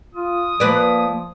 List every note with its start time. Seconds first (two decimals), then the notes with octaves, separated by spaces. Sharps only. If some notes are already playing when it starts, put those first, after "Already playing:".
0.15 F4 D#6
0.60 F3 A#3 B4 D5